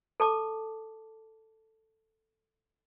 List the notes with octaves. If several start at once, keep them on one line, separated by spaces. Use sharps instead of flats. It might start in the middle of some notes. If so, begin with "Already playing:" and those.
A4 A5 D6